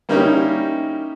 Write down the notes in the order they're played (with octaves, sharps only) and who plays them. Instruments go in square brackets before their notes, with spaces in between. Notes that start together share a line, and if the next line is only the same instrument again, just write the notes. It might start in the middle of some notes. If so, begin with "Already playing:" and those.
[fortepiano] G3 A#3 C#4 D#4 E4 G4